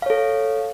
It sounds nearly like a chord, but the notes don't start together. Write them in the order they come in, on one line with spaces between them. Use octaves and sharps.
F5 C#5 A4